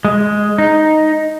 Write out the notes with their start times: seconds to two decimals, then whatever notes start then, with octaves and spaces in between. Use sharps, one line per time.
0.05 G#3
0.58 D#4